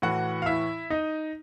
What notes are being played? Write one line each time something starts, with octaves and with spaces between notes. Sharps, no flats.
A2 E3 F#4 F#5
F5
E4 E5
D#4 D#5